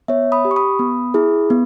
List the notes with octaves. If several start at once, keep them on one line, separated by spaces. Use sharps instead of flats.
B3 C#5 E5
B5 D#6
G4
C#6
B5 D#6
B3
E4 G#4
B3